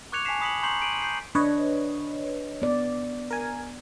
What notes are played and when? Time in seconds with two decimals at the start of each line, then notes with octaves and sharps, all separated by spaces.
0.12 C#6 D6 F#6 G#6 C#7 F7
0.25 G#5 A5 C#6 B6 C7 E7
0.40 B5 D#6 B6 C#7 F#7
0.63 A#5 C6 C#6 G6 C7 F#7
0.82 D7 D#7 F#7
1.02 G6 C7
1.35 D4 B4 C#5 D#5
2.62 B3 D5
3.31 A#4 G#5